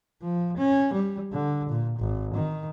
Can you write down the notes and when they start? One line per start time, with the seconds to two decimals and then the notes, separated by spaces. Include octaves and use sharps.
0.22 F3
0.57 C#4
0.93 G3
1.33 D3
1.69 A#2
2.00 G#1
2.34 D#3